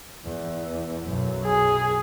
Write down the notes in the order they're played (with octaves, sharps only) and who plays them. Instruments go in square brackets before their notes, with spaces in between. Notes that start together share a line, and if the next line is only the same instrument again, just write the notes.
[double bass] E2
B1 F#2
[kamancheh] G#4